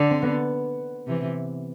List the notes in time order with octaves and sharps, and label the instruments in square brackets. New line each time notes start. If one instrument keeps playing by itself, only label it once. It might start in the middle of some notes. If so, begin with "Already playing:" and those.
Already playing: [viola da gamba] D3
[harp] C4
B3
[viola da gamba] C3 E3